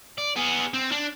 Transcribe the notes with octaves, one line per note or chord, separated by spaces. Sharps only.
D5
B3 G#4
C4
D4